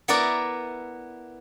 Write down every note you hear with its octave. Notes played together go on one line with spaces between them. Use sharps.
B3 E4 A#4 B4 D5 E5